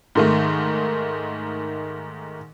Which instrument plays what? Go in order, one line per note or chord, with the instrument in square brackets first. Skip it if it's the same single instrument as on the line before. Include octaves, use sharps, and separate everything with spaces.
[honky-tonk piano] G#2 D#3 A3